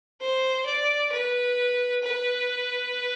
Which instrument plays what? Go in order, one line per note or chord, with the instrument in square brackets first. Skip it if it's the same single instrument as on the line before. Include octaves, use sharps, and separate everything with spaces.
[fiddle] C5
D5
B4
B4